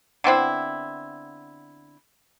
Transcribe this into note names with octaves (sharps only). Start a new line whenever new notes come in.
D3 B3 C4 E4